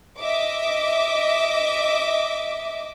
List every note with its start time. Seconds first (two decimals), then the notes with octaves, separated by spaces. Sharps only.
0.19 D#5 E5 D6